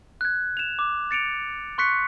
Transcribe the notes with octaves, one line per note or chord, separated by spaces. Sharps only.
F#6 G#6
E7 F7
D6
A6 C#7 D7 F7
C6 C#6 F#6 B6 C#7